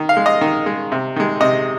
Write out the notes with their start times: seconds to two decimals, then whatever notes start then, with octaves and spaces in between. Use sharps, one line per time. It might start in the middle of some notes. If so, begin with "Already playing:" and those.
Already playing: D#3
0.09 F5
0.17 G#3
0.26 D#5
0.41 D#3
0.66 G#3
0.92 C3
1.16 D#3 G#3
1.40 C3 D#5